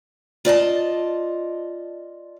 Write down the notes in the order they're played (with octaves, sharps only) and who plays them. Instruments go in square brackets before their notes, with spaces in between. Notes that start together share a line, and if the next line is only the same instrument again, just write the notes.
[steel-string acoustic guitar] F4 D5 D#5 A5